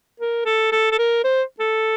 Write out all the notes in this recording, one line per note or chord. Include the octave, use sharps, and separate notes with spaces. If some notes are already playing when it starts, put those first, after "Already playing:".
A#4
A4
A4
A4
A#4
C5
A4